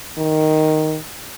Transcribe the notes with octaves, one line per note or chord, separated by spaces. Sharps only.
D#3